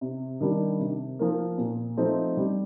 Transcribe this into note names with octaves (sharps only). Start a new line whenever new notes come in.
C3
D#3 G3 D4
C3
F3 A#3
A#2
F3 A3 C4 D#4
G3